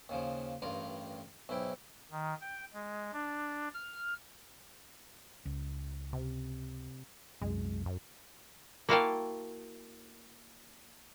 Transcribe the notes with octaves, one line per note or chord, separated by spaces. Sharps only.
D#2 C#3 F3
A1 G2 G3 F4 A#4
B1 G#2 E4 G5
D#3
G5
G#3
D4
F6
C#2
C3
C2 F#2 G#3
F#2
A#3 E4 F#4 F5 G5 A5